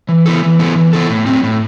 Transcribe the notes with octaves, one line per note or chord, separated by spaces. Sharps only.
E3
B3 E4 A4
E3
B3 E4 A4
E3
B3 E4 A4
A2
F#3 C4
A2